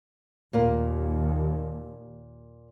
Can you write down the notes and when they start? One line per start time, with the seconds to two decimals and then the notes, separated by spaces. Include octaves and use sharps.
0.53 D#2 A#2 A#3 A#4